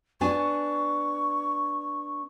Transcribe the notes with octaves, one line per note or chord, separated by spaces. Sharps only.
B3 D4 G#5 C#6